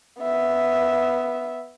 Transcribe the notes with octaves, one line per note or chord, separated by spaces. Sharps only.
B3 E5